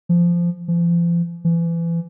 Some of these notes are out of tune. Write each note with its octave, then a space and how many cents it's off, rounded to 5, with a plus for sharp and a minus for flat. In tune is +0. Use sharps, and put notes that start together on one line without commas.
F3 -15
F3 -40
E3 +30